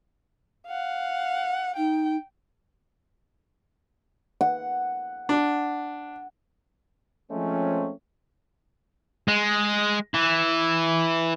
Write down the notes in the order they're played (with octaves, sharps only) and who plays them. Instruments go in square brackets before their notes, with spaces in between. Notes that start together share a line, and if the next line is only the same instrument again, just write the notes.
[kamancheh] F5 F#5
[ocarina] D#4 [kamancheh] G5
[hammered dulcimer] F#5
[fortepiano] D4
[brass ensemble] F3 G#3 A3 C4 C#4
[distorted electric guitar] G#3
E3